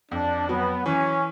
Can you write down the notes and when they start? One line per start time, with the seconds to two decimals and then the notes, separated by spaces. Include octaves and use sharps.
0.11 F2 D4
0.49 F#3 B3
0.86 E3 C#4